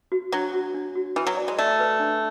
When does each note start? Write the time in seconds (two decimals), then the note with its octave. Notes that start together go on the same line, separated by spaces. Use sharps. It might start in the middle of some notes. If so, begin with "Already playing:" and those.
0.12 F#4
0.32 F#3 D4
0.54 F#4
0.74 D4
0.96 F#4
1.16 E3 B4
1.27 F#3
1.37 D5
1.48 G#3
1.58 A3 D5
1.80 B4
2.00 D4